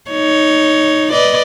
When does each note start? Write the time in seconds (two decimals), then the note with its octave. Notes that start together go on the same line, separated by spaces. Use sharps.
0.11 D#4 C#5
1.11 B4 D5 D#5